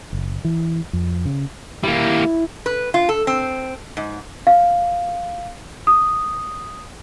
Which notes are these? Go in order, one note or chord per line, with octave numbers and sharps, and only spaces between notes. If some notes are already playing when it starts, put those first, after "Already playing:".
F#1
E3
F2
C#3
G3 A#3 E4
B4
F4
A4
C4
G#2
F5
D#6